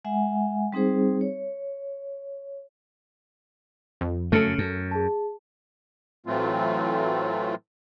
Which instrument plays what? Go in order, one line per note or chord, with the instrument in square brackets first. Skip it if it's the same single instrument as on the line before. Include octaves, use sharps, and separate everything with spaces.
[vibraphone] G#3 E5 F#5 G#5
G3 C4 D#4 G#4 C5
C#5
[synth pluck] F2
[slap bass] F#2 C#3 [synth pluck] A3 A4 [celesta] F6 C#7
[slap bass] F#2
[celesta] G#4 A5
[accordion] A2 E3 F#3 A3 C4 F4